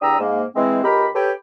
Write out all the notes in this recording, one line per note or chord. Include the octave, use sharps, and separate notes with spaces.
E2 D4 G4 A#5 D#6 E6
G#2 A#3
E3 G#3 C4
C#2 G4 A#4 D#5 B5
G4 A4 B4 C#5 G5